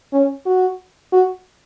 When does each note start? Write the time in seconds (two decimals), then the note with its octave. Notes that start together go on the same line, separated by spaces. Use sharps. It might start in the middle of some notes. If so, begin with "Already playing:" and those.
0.13 C#4
0.46 F#4
1.12 F#4